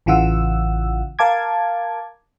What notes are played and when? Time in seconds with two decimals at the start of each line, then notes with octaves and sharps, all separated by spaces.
0.06 A1 C#3 E3 F4 F#5 E6
1.19 A#4 F5 A5 D6 G#6